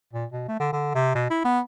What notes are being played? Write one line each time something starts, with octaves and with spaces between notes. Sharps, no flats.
A#2
B2
A3
D3
D3
C3
B2
E4
B3